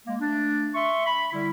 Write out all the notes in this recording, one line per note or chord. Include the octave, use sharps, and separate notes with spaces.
G#3 A#3
A3 D4
E5 C6 C#6
B5
D3 G3 E4